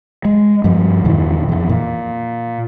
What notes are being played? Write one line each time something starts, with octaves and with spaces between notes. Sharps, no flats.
G#3
G2 F3
E2 A#2 D#3 E3
F2 E3
A#2